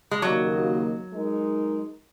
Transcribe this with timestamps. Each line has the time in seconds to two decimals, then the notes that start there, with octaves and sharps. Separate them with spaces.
0.11 G#3
0.22 D#2 C#3 F#3 A#3 F#4 D#5
1.11 G#3 D#4 A#4